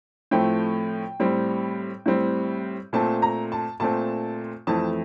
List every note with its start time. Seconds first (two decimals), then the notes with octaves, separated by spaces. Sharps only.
0.31 A2 F3 A3 C4 G5
1.20 A2 G3 C4
2.06 A2 G3 C4
2.93 A#2 A3 C4 A5
3.22 A#5
3.52 A5
3.80 A#2 A3 C4 A5
4.67 F2 E3 A3 C4 A5